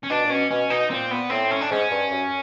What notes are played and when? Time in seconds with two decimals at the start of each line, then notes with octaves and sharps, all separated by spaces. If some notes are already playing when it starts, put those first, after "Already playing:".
0.03 C#4
0.10 B2 D4
0.25 A#2
0.30 B2 C#4
0.50 B2 C#4
0.70 B2 D#4
0.90 A#2 C4
1.11 B3
1.30 A2 C4
1.51 C#4
1.61 D4
1.70 G#2 C#4
1.91 G2
2.11 F#2